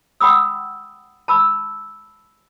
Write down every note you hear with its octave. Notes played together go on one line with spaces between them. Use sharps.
F#5 G5 B5 D#6 E6
A5 B5 E6